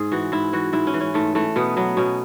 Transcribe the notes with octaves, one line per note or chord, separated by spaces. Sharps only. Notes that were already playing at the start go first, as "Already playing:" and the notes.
Already playing: G#2 G#4
E3 F#4
G#2 E4
E3 F#4
G#2 E4
C#4
E3
C#4
G#2 A3
E3 A3
B2 B3
F#3 B3
B2 C#4